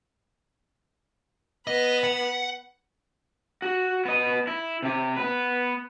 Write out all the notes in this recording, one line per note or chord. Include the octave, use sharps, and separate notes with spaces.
B3 D#5 B5
F#5
F#4
B3 D#5
E4
C3 G4
B3 B4